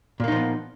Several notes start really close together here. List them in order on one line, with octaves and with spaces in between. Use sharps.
A#2 A#3 D#4 F3 B3